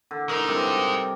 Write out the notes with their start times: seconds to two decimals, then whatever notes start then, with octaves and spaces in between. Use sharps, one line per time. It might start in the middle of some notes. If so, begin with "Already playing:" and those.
0.11 D3
0.29 G#3 D#4 A#4
0.48 G2 C3 A#4